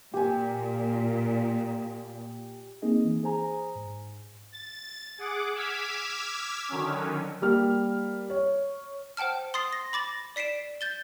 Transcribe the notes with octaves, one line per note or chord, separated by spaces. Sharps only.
A#2 G4 G#5
A#3 C4 D#4 G#4 D#5
E3
G#4 C5 G#5 A#5
G#2
A6
G#4 F#5 D6
D6 E6 F6 G#6 B6
D3 D#3 F#3 C#4
G3 A#3 F6
C#5
C5 F#5 G5 A5 F6
C6 D#6 A6 C7
A#6
B5 D6 A6 A#6
D5 B6 C7 D7 E7
G6 A6 G7